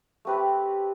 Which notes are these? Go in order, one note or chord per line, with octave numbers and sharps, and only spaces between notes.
A3 C4 G4 B4